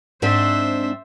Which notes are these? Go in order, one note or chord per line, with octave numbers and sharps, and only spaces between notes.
G#2 C4 D4 C5 E5